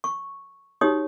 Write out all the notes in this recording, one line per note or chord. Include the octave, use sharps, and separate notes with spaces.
C#6
D#4 F#4 G4 C#5 D#6